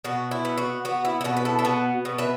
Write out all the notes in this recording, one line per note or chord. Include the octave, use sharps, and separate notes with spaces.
B2 F#4
E4
B3
F#4
B3 F#4
E4
E4
B2 F#4
B4
E4 A4
E4
B3 F#4
B2
B4 E5